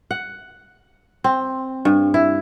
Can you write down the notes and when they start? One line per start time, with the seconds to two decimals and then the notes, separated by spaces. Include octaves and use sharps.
0.11 F#5
1.24 C4
1.85 G2
2.14 E4